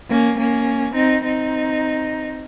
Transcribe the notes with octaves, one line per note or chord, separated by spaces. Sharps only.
A#3 C#4
A#3 C#4
C4 D#4
C4 D#4